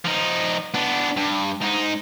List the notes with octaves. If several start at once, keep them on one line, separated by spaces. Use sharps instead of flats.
F3 D#4
B3 D4
G2
G#2 D#4